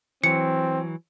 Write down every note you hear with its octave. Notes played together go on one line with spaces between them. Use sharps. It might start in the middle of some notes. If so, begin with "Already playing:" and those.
E3 F#3 C4 C#7